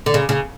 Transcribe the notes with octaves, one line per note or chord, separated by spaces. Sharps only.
D3
C#3
C#3